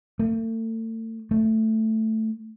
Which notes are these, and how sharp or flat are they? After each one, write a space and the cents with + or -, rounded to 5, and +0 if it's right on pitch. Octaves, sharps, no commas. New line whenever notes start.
A3 +40
A3 +5